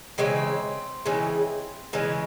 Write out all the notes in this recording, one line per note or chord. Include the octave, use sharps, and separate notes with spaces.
C#3 E3 G#3 C4
C#3 E3 G#3
C#3 E3 G#3